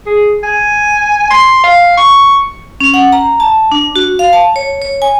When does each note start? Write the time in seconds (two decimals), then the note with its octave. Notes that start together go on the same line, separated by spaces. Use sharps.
0.06 G#4
0.43 G#5
1.30 C6
1.64 F5
1.97 C#6
2.80 C#4
2.94 F#5
3.12 A#5
3.40 A5
3.72 D4
3.96 F#4
4.19 F5
4.33 A5
4.56 C#5
4.82 C#5
5.02 G#5